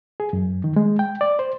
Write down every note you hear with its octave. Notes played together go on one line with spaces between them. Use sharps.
G#4
F#2
D#3
G#3
G5
D5
C5